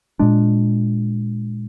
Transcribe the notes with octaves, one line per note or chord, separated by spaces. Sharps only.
A#2 G#3 D4